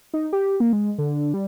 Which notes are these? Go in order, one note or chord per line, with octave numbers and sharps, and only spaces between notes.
D#4
G4
A#3
G#3
D3
G3